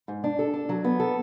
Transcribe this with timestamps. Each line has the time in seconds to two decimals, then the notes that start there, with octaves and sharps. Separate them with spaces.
0.08 G#2
0.24 D4
0.39 A4
0.54 D4
0.69 F#3
0.84 B3
1.00 A4